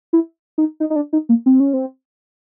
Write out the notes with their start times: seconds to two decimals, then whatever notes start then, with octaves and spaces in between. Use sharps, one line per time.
0.13 E4
0.58 D#4
0.80 D#4
0.90 D#4
0.96 D4
1.13 D#4
1.29 A#3
1.46 C4
1.60 C#4
1.73 C4